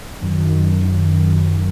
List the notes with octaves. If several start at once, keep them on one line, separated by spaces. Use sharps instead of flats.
F#2 D#3